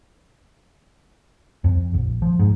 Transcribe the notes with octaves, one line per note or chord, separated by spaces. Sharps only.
F2
A#1
F3
G#2